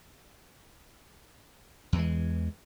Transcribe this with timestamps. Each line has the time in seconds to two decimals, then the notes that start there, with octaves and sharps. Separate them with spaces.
1.93 E2
1.96 E3
1.99 G#3